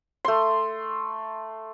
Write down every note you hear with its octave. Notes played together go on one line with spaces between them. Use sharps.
A3 C6